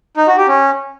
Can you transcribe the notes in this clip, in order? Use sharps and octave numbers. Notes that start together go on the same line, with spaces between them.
D#4
F#4
G4
C#4